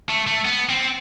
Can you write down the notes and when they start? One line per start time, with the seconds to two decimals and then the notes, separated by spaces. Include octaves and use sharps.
0.09 A3
0.27 A3
0.45 B3
0.69 C4